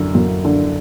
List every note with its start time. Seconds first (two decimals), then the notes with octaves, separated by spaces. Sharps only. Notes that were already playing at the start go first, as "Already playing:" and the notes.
Already playing: F#2 D3
0.15 F#2
0.44 D3